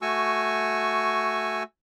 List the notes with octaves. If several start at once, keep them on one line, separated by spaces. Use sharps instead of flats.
A3 F#4 G#5 C#6 E6